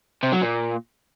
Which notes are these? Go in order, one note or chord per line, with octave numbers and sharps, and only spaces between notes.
C3
F#3
A#2